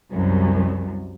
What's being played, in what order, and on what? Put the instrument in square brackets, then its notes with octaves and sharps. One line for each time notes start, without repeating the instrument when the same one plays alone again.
[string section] C2 F#2